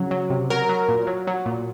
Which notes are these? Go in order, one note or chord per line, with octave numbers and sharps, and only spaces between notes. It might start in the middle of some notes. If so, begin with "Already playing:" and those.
Already playing: C#3 F#3
F#3
C3
F#3 A#4
F#3
A#2
F#3
F#3
A#2